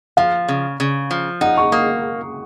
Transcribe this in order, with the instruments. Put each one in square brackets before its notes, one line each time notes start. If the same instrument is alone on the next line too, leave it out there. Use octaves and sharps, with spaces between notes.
[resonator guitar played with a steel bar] F3 [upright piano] F5
[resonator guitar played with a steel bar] C#3
C#3
F3
[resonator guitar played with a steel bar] D#4 [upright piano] F#5
[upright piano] C#6
[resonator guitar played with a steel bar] A#3 [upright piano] D#6